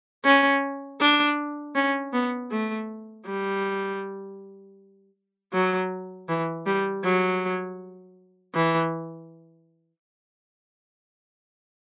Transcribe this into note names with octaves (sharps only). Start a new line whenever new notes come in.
C#4
D4
C#4
B3
A3
G3
F#3
E3
G3
F#3
E3